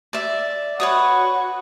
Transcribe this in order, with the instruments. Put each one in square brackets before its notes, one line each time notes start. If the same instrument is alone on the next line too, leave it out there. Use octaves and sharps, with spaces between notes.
[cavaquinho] D5 E5
[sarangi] F#4 [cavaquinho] B4 C#5 D#6